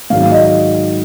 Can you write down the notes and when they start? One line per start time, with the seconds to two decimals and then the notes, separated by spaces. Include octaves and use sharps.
0.10 G#2 D#3 F#3 F5
0.32 D#5